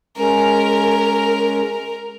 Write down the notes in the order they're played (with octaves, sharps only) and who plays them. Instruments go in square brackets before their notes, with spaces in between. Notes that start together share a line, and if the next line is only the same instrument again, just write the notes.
[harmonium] G#3 C#4 [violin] A#4